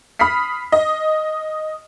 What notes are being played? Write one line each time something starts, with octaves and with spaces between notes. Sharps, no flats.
B5 D#6 F6 B6 C7
D#5